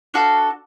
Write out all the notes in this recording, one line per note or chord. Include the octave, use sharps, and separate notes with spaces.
D4 F#4 A4 F5